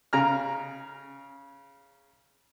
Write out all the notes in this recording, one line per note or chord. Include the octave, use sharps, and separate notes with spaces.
C#3 A#5 F6